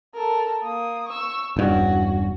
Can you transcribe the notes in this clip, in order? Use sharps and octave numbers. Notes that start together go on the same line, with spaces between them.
A4 A#4
A#3 D#6
C#6 E6
E1 G2 C#4 F#4